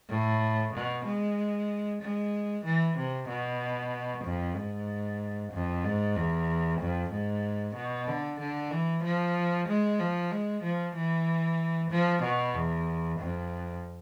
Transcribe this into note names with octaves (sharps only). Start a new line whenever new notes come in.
A2
B2
G#3
G#3
E3
C3
B2
F2
G#2
F2
G#2
E2
F2
G#2
B2
D3
D3
E3
F3
G#3
F3
G#3
F3
E3
F3
B2
E2
F2